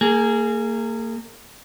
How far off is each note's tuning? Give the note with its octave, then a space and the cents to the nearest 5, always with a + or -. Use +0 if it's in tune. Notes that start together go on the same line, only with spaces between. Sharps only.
A#3 -35 G#4 +0